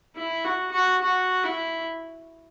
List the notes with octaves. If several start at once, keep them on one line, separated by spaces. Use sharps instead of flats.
E4
F#4
F#4
F#4
E4